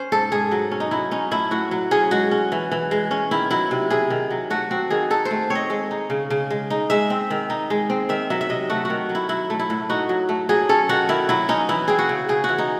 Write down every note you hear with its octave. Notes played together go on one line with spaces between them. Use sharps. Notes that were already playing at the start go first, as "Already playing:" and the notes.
Already playing: C#4 C5
G#2 A4
G#2 G#4
F#3
C#4
D#4
F#3 E4
C#4 D#4
A2 E4
A2 F#4
F#3
C#4 G#4
G#3 F#4
C#4
E3
E3
G#3
C#4
D#3 E4
F#3 E4
C3
C3 G#4
D#3
F#3
A3 F#4
C4 F#4
D#3 G#4
D#4 A4
C5
A3
C4 C#5
D#5
G#3
D#4
C#3
C#3
G#3
D#4
G#3 E5
C4
D#3
D#4
G#3
C4
D#3 E5
F#3 E5
E5
C3 D#5
A3 F#4
D#3 F#4
F#3
E4
F#3 E4
A3
E4
A2
D#4 F#4
F#3
A3
F#3 G#4
C#4 A4
D#3 F#4
D#3 E4
F#3 E4
C#4 D#4
E3 E4
C4 G#4
F#4
C#3
C#3 G#4
E3 F#4
D#4